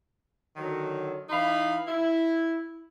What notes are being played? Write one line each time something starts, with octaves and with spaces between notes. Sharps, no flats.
D3 D#3 F#3
E3 D#4 F5 B5
E4